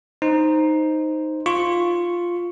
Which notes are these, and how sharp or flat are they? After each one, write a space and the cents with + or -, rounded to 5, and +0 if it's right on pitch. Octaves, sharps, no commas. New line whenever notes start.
D#4 +0 C5 +0
F4 +0 C#6 +0